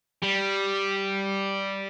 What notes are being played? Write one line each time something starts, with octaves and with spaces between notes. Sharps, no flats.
G3